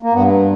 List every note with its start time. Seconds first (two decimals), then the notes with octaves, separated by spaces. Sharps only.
0.03 A#3
0.13 G2 B3